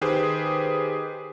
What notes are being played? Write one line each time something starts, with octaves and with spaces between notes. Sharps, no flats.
D#3 G4 G#4 B4 C5